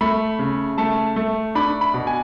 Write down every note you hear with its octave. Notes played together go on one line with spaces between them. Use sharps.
A3 B5
C#3
A3 A5
A3
D4 B5
B5
B2
G#5